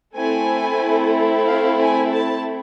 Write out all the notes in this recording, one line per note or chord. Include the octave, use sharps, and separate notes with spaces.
A3 C4 E4 A4 G#5
F5
G#5
A5